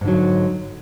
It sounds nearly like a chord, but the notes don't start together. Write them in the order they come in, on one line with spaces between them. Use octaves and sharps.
G#2 D3 F#3